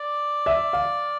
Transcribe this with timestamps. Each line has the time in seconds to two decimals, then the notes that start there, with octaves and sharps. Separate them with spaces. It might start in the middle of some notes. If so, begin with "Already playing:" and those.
Already playing: D5
0.46 E5
0.73 F5